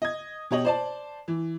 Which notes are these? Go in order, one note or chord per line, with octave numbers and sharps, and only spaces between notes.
D#5 G#6
B2 G4 C#5 D#5 F#7
C5 D5 A5
E3